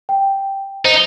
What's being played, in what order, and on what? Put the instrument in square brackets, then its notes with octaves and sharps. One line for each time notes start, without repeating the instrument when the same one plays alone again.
[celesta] G5
[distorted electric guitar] D#4 [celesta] C5